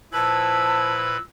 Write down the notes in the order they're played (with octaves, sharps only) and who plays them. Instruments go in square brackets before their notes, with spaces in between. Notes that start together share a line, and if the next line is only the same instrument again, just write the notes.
[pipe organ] A#2 B4 B5 [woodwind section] F3 E4 [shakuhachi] A5 [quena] E6